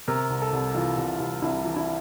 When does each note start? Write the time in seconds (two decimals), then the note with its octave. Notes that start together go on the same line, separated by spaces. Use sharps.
0.08 C3 A#4
0.30 C2
0.42 A4
0.53 C2
0.74 E3 F4
0.98 C3
1.19 C2
1.42 C2 E4
1.65 E3
1.76 E4